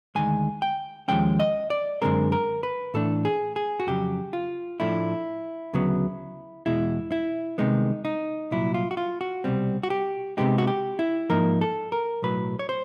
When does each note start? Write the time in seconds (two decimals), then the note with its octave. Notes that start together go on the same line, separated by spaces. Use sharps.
0.15 D2 C3 D#3 G#3 G#5
0.62 G5
1.08 D#2 C#3 F3 G#3 C#4 G5
1.40 D#5
1.70 D5
2.02 F#2 D3 F3 G#3 C4 A#4
2.32 A#4
2.63 B4
2.94 A2 E3 A3 D4 A4
3.25 G#4
3.56 G#4
3.80 F#4
3.87 F2 C#3 F#3 G4
4.33 F4
4.80 A2 F3 A3 D4 E4
5.73 D2 C#3 F#3 B3
6.66 E2 B2 G#3 E4
7.12 E4
7.58 C2 C3 D#3 G#3 B3 D#4
8.05 D#4
8.51 C2 A#2 F#3 E4
8.74 F4
8.91 F#4
8.97 F4
9.21 F#4
9.44 C2 B2 G3 C4
9.83 F#4
9.90 G4
10.37 C3 D#3 G#3 B3 D#4 G4
10.58 F#4
10.67 G4
10.99 E4
11.30 G#2 F3 A#3 D#4 A#4
11.61 A4
11.92 A#4
12.22 B1 A2 F#3 B4
12.59 C#5
12.69 C5